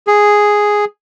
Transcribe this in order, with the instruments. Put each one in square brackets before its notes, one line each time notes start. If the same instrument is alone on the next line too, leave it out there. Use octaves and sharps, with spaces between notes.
[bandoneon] G#4